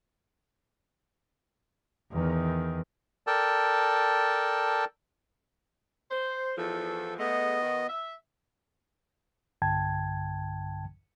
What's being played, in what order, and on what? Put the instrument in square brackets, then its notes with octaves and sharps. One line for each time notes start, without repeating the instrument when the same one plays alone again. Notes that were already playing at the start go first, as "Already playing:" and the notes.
[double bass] E2 D#3
[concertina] A4 A#4 D5 G5 A5
[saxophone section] C5
[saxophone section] E2 F3 [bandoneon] A4
[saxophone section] G#3 A3 [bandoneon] B3 D#5
[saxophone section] D#3 F#4
E5
[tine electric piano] B1 G2 D3 G5 A5 G#6